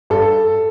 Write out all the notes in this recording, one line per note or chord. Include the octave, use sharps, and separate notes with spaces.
G2 A4